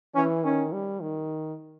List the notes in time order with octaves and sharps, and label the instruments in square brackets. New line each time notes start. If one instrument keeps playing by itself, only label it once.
[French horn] E3 [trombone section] C#4
[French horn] D#3 [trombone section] C#4
[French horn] G3
D#3